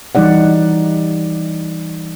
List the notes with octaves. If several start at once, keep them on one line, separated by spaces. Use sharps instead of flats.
E3 G3 D#4 D5 F#5